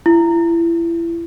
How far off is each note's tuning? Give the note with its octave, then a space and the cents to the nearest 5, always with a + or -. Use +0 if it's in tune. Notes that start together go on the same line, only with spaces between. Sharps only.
E4 +30